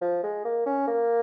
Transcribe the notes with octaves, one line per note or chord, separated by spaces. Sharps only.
F3
G#3
A#3
C#4
A#3